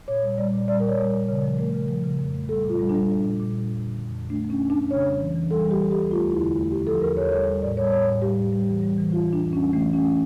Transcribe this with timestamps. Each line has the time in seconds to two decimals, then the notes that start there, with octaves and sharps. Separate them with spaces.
0.08 A#2 C#5
0.22 G3
0.38 G3 D5
0.53 A#2
0.68 G3 D5
0.80 A#4
0.83 G3
0.88 C#5
0.98 G3
1.14 A#2
1.28 C#3 C#5
1.44 F3
1.59 A3 A#4
1.74 C#3
1.89 F3
2.04 C#3
2.19 F2
2.34 A3
2.49 G3 A4
2.64 A#2
2.69 F4
2.79 G3
2.89 D4
2.95 G3
3.09 G3
3.25 A#2
3.40 A#2
3.54 G3
3.70 F2
3.85 D3
4.00 F2
4.15 F2
4.30 A3 D4
4.45 F2
4.50 C#4
4.60 F2
4.70 D4
4.75 F2
4.91 C#3 C#5
5.06 G3
5.20 E3
5.36 E3
5.51 G3 A4
5.66 G3 G4
5.81 G3
5.91 D2 G4
6.11 A3 F4
6.26 E2 E4
6.41 D3
6.56 A3
6.71 A3 G4
6.87 F3 A4
7.02 E2 A#4
7.16 E2 C#5
7.31 G3 C#5
7.47 G3
7.62 A2 D5
7.77 G3 C#5
7.92 A2 C#5
8.07 A2
8.22 G3 G4
8.37 A2
8.53 G3
8.68 E3
8.83 G3
8.98 E3
9.12 G3 F4
9.28 E3 D4
9.42 F2
9.53 G3 C#4
9.73 E3 A3
9.88 A3
9.93 C#4
10.03 A3